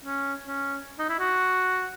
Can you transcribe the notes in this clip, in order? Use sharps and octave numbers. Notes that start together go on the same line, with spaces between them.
C#4
C#4
D#4
E4
F#4